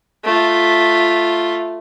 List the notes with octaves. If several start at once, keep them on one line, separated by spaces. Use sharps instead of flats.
A3 F4